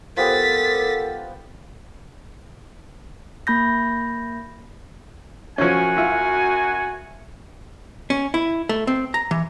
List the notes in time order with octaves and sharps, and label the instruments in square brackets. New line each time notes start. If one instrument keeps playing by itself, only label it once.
[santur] F3 B3 G4 [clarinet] A4 [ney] A#4 [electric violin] A6 B6
[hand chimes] A#3 B5 G6 A#6
[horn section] F#2 F#4 G#5 [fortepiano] F3 C#4
[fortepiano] E4 F4
[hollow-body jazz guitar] C#4
E4
A3
C4
A#5
E3